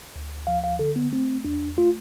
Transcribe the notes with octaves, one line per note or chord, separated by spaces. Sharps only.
D2
F3 F5
F5
D3 A4
B3
A3 C4
E2 D4
A3 F4